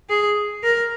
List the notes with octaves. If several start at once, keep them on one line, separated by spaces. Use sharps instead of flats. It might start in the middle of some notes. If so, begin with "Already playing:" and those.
G#4
A#4